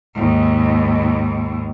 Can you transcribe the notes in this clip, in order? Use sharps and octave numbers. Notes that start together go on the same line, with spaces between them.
D#2 G#2